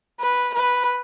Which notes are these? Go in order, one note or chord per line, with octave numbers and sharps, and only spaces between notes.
B4
B4